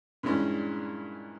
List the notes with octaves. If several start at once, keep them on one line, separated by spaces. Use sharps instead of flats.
G2 A#2 E3 G#3 C#4